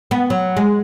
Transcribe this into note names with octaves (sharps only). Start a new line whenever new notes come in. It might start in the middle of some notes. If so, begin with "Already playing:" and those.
B3
F#3
G#3